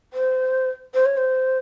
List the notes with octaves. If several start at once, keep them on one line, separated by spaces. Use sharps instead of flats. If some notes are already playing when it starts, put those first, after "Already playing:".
C5
C5
C#5
C5